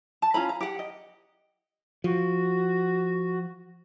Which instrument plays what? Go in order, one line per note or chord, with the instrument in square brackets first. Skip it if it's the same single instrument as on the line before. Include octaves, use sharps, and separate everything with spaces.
[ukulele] A5
C#4 F4 A#5 B5
A#5
G4 F#5
D#5
[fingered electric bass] F3 [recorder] F#4